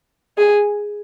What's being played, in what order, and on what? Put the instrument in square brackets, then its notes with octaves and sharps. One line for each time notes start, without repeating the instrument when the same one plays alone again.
[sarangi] G#4